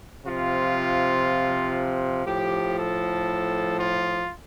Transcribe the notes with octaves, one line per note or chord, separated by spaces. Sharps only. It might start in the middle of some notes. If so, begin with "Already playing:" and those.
C3 F3 F4
A2 F3 G4
A4
F4